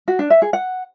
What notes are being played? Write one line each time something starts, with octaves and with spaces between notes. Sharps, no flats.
F#4
D4
E5
G#4
F#5